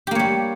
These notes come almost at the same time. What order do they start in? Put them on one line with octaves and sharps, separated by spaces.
G4 A#3 C#5 G3